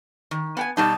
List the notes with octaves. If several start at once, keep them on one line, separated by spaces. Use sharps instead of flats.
D#3
B3 G5 G#5
B2 G3 D#4 A5